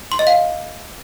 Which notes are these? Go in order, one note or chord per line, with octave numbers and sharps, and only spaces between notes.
C6
D#5
F5